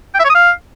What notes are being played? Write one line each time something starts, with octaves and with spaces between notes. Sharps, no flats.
G5
E5
C#5
D#6
F5